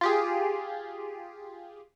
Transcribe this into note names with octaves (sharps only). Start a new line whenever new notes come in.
F4 G4 G#4